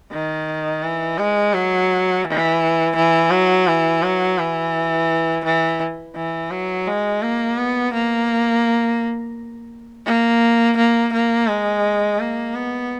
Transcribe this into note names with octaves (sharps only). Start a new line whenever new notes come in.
D#3
E3
G#3
F#3
E3
E3
F#3
E3
F#3
E3
E3
E3
F#3
G#3
A#3
B3
A#3
A#3
A#3
A#3
G#3
A#3
B3